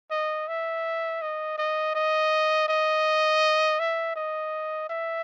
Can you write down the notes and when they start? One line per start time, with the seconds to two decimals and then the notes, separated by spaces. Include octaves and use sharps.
0.11 D#5
0.48 E5
1.22 D#5
1.58 D#5
1.95 D#5
2.69 D#5
3.79 E5
4.16 D#5
4.90 E5